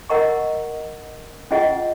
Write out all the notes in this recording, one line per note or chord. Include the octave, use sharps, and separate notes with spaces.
A#4 D#5 F#5 A#5 C#6
C#4 F4 G#4 D#5 F#5